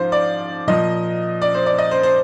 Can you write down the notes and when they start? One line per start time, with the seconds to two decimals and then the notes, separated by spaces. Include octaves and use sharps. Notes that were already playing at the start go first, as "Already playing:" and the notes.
Already playing: G#2 F3 C5 F5
0.12 D5
0.68 A#2 F3 D#5
1.42 D5
1.54 C5
1.66 D5
1.78 D#5
1.91 C5
2.03 C5